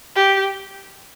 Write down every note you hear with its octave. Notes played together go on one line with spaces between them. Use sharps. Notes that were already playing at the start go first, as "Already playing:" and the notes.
G4